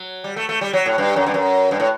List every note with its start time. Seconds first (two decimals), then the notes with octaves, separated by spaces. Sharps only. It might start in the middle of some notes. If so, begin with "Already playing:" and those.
Already playing: F#3
0.24 G3
0.36 A3
0.49 A3
0.61 G3
0.73 F#3
0.86 A2
0.98 G2
1.16 F#2
1.26 G2
1.34 F#2
1.71 G2
1.80 A2